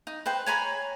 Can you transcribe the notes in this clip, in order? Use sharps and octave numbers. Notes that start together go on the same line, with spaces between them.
D#4
B4 C5 G5
C#5 G#5 A#5 B5